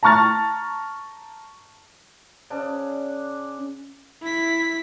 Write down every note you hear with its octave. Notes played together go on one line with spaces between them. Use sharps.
A5 A#5 C#6 F6 A6
C#3 D4
E4 B6